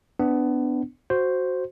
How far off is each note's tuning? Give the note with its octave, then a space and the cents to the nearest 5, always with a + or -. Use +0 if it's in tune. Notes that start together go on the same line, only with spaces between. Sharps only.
B3 +20 D4 +0
F#4 +0 C5 +0